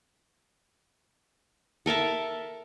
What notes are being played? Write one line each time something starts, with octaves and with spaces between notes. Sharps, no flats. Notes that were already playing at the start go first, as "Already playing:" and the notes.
A4 A#4 E5 A5